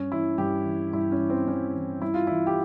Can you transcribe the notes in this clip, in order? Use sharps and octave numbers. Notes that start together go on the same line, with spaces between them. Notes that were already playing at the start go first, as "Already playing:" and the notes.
Already playing: G2 C#4
E3 E4
G2 G4
E3
G2 E4
C#4
E3
C4
G2 C#4
E3
G2 E4
F4
E3 E4
G4